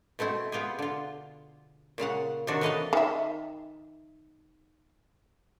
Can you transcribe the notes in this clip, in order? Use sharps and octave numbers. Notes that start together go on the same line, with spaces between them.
B2 A3 C4 E4
B3 F4 G4 G#4
D3 F4
A#2 C#3 F5 F#5
C3 D#3 F#3 D4 F#4
E3 A3 B4 D#5 F5 A5
D#3 E5